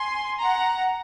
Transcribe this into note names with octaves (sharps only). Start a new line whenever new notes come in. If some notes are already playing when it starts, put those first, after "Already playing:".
Already playing: G#5 C6
F#5 A#5